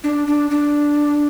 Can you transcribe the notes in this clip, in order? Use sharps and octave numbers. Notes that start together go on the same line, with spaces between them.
D4
D4
D4